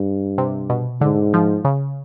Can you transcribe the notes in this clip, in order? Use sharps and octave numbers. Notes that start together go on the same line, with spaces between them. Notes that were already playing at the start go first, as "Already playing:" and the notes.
Already playing: G2
C3
B2
G#2 D3
F3
C#3